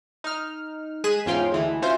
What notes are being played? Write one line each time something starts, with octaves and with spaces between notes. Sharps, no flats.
D#4 F6
G#3 G#4 F#6 B6 D#7 E7
E2 G#2 C#4 F4 G5 C6
D2 E3 G#3
C#4 F4 F#4 C5 E5